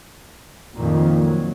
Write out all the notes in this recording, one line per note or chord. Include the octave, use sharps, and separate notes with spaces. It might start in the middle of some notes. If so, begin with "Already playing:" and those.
F2 A#2 D#3
F#3